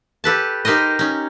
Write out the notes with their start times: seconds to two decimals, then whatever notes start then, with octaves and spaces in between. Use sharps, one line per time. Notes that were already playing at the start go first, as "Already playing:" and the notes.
0.24 G4 A4 B4 A5
0.65 D#4 G4 A#4 C5 D#5
0.99 C#4 D#4